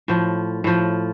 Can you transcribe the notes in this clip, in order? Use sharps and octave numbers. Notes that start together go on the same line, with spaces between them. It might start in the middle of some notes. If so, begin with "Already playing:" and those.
A2 F3
A2 F3